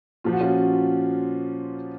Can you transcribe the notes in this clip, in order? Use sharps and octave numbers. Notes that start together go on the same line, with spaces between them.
A#2 F3 F4
F#4
C#4 F4